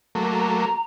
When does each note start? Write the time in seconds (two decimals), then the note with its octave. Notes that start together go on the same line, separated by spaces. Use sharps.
0.15 F#3 A3 A#3
0.32 A#5